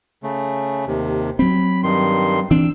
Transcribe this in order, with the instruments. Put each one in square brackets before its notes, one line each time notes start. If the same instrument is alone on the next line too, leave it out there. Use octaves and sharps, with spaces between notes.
[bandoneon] C#3 A3
D#2 C3
[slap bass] F#3 C4 [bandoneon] B5
[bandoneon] G2 D#3 C6
[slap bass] E3 C4 D4 [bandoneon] E6